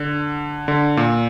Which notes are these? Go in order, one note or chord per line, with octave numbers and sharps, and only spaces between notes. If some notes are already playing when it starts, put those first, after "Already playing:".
Already playing: D3
D3
A#2